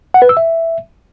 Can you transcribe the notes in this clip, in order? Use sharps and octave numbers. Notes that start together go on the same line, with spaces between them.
F#5
B4
E6
E5